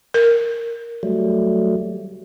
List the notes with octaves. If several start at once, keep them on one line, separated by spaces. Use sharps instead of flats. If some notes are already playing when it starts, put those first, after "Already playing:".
A#4
F#3 G3 A3